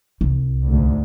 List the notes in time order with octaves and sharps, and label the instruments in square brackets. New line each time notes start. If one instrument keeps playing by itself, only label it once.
[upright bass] C2
[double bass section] D2 G#2